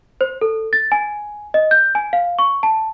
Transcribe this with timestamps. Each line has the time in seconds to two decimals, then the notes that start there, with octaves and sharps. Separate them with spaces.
0.21 C5
0.41 A4
0.73 A6
0.92 G#5
1.54 D#5
1.71 G6
1.95 G#5
2.13 F5
2.39 C#6
2.63 A5